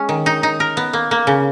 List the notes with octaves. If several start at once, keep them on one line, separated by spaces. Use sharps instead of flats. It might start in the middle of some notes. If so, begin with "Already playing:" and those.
Already playing: G#3 C#4
D#3
D#4
D#4
A#4
B3
A#3
A#3
C#3